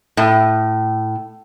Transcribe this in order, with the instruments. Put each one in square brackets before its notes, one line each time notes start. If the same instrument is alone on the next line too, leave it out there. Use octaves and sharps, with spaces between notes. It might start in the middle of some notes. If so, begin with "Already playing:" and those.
[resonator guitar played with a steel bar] A2